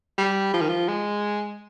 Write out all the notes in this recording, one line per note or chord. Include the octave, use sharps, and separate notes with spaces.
G3
F3
D#3
F3
G#3